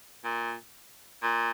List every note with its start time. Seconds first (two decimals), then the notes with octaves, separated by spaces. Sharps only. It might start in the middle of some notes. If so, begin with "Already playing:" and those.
0.24 A#2
1.23 A#2